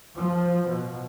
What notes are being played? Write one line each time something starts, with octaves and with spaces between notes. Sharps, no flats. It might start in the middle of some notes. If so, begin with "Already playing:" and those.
F3
B2